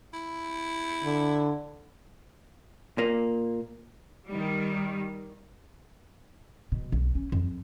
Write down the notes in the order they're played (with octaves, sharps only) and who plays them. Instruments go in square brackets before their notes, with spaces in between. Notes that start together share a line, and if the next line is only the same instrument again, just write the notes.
[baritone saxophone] E4
[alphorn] D3
[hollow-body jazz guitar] A#2 A#3
[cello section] D#3 G3
[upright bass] B2
B1
C#4
F2